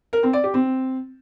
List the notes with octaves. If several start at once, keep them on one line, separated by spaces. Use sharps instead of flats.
A#4
C4
D5
G4
C4